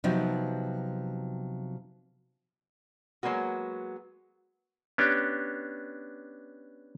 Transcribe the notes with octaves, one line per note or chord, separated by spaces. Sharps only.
C3 F3 F#3 B3 D#4
F#3 G#3 A#3 B3 F#4
B3 C#4 D4 G4